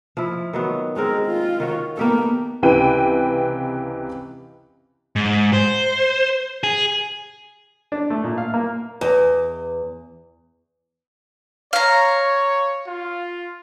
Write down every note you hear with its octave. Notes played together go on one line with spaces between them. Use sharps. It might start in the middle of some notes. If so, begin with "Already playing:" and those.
F3 E4
D#3 F#3 B3
G#3 C4 G#4 A#4
F4
D#3 F#4 C#5
A#3 B3 G4 A4
C#2 C3 E3 B4 G5 D#7
G#2
C5
G#4
D4
A3
A#2
F5
A#3
E2
C#5 F5 A#5
F4